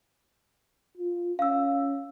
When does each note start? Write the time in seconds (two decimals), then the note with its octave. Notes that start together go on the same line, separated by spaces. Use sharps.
0.97 F4
1.39 C#4 F5 E6